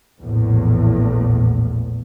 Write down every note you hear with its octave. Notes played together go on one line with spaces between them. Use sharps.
A#1 E2 A2